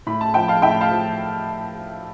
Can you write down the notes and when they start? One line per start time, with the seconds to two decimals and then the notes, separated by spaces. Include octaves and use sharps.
0.07 A2 B5
0.21 A5
0.34 F3 G5
0.48 F5 A5
0.62 A2 E5 G5
0.81 F5 A5
0.91 F3